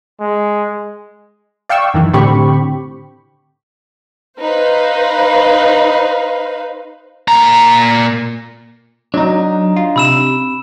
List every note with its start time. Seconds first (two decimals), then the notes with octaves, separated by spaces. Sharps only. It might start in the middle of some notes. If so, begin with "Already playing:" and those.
0.21 G#3
1.69 D5 F5 G5 C#6 E6
1.94 F#2 D#3 E3
2.14 A2 D3 C4 G4 B5 C#6
4.40 D#4 B4 C5 F5
7.28 A#2 A#5
9.14 F#3 D4 D#4
9.76 F4
9.96 C3 B5 E6 E7